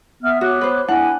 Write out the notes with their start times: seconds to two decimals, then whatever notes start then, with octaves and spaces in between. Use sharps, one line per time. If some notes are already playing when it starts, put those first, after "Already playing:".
0.23 B3 E5 F6
0.41 F#4 C#5 D6 F#6
0.61 B4 C5
0.88 D4 E4 F#5 G#5